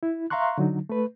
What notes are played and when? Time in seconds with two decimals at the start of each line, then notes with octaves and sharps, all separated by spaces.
0.03 E4
0.30 E5 F5 A#5 C6 C#6 F#6
0.58 D3 F#3 D#4
0.89 A3 B4